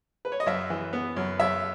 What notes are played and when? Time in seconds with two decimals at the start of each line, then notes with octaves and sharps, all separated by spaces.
0.25 B4
0.32 C#5
0.40 D#5
0.46 F#2 E5
0.70 E3
0.93 B3
1.17 F#2
1.40 F#2 E5